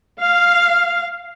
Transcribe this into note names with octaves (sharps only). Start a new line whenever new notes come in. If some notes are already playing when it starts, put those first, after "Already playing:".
F5